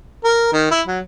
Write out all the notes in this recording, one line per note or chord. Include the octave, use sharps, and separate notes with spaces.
A#4
D#3
E4
F#3